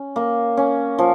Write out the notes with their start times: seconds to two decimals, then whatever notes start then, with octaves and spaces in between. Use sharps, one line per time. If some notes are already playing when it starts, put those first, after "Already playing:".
Already playing: C#4
0.16 A#3
0.57 C#4
0.98 F3